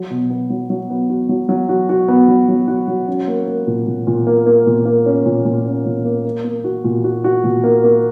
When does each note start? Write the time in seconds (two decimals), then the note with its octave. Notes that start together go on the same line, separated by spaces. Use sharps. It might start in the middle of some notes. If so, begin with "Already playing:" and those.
Already playing: F#3
0.10 B2
0.30 B3
0.50 F#3
0.70 F#3
0.90 B3
1.09 F#4
1.29 F#3
1.49 F#3
1.69 F#4
1.89 F#4
2.08 B3
2.28 F#3
2.48 F#3
2.68 F#4
2.88 F#3
3.08 C#4
3.27 A#3
3.47 A#3
3.67 A#2
3.87 A#2
4.07 A#2
4.27 A#3
4.46 A#3
4.66 A#2
4.85 A#3
5.06 C#4
5.25 A#2
5.45 A#2
5.65 C#4
5.86 A#2
6.05 A#3
6.25 A#3
6.44 A#3
6.64 F#4
6.84 A#2
7.04 F#4
7.24 F#4
7.44 A#2
7.64 A#3
7.84 A#3